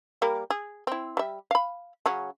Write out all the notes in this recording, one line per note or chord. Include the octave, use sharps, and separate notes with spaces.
G3 A#3 A#4
G#4
C4 E4
G3 E5
F5 B5
C#3 F#3 C#4